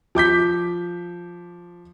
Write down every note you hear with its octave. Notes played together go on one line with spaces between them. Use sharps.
F3 D6 G6 B6